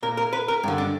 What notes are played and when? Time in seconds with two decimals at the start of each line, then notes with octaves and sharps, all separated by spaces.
0.03 A#2 A#4
0.17 A#4
0.33 B4
0.48 A#4
0.63 G2 D3
0.78 D4